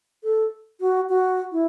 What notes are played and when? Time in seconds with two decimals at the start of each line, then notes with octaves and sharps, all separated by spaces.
0.23 A4
0.81 F#4
1.09 F#4
1.52 E4